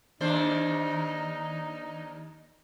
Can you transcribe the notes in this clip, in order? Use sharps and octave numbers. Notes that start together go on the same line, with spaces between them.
D#2 D4 D#4 C5